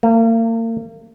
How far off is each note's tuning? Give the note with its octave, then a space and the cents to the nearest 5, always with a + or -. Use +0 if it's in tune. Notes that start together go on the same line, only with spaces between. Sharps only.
A#3 -40